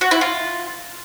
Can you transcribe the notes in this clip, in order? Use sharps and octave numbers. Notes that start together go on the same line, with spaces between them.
F#4
E4
F4